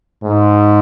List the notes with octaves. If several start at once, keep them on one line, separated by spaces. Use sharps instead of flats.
G#2